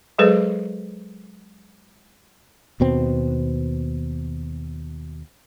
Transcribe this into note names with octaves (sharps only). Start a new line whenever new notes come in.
F#3 G#3 G#4 A4 B4 C5
D#2 B2 C4